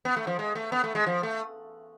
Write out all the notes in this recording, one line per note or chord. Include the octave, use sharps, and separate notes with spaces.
B3
A3
F3
G#3
A3
B3
A3
G#3
F3
A3